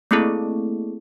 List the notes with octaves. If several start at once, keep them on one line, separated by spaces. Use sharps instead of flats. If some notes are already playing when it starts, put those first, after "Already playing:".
A3 A#3 C4 E4 G#4 A4